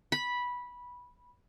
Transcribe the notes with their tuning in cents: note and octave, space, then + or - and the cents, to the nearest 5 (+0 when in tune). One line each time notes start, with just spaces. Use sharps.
B5 -10